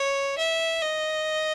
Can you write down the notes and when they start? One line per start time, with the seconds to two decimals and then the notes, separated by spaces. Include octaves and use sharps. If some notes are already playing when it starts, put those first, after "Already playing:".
Already playing: C#5
0.38 E5
0.83 D#5